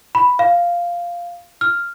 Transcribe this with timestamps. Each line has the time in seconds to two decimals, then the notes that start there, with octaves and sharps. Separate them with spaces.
0.15 B5
0.39 F5
1.61 F6